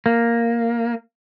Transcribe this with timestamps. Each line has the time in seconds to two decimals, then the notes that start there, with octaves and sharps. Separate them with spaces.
0.06 A#3